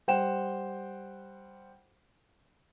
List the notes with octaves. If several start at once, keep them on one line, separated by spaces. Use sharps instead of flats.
G3 C5 F#5 G5 E7